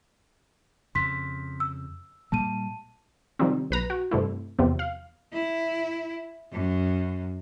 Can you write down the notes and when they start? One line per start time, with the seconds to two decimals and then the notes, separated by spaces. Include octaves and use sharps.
0.95 F2 C#3 C6 B6
1.60 E6
2.32 A#2 G3 A#3 A5 D#7
3.39 C3 D#3 F3 G3 C4
3.71 B1 B4 A#5
3.90 F#4
4.11 G2 C3 A3 E4
4.59 E2 C3 F3 B3
4.79 F5
5.33 E4
6.52 F#2